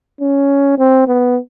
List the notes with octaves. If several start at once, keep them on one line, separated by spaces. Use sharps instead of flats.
C#4
C4
B3